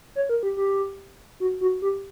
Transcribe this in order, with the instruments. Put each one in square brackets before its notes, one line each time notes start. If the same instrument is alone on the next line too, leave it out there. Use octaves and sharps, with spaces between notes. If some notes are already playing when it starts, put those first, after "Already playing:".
[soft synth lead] C#5
A#4
G4
G4
F#4
F#4
G4